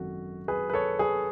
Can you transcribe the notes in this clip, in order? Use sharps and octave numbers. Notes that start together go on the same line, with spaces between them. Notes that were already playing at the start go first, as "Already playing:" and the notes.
Already playing: G#1 F#2 D#3 F#4 A4
G#4 B4
B4
A4 C#5
G#4 B4